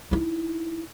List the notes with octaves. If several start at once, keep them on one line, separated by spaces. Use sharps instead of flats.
D#4 E4